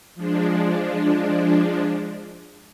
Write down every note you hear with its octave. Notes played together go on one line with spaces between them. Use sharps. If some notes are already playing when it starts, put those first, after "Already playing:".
F3 G#3 D4